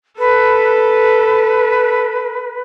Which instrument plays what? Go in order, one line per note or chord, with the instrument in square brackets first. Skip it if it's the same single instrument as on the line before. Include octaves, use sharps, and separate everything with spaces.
[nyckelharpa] A4 [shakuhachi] B4